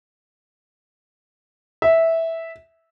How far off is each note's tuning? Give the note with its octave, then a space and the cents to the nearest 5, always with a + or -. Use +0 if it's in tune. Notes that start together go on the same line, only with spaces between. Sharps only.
E5 -10